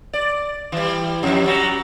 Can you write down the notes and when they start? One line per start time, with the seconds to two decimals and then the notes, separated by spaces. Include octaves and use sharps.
0.13 D5
0.72 E3 G3
1.23 F2
1.44 F#3 G3 F#4